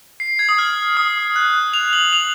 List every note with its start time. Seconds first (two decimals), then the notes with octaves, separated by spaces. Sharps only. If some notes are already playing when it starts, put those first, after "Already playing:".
0.20 C7
0.39 G#6
0.49 D#6
0.58 F6
0.97 D#6
1.36 F#6
1.74 F7
1.93 F#7
2.13 F7